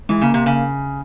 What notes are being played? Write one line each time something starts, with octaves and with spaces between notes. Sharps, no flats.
E3 G#3
C#3 A#3
C3
C#3